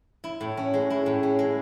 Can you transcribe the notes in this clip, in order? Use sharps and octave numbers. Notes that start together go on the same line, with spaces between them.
E4
A2
C#4
G#3
E4
A2
C#4
G#3